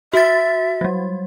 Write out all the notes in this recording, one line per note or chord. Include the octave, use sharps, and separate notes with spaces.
F#4 E5 A6
F#3 G3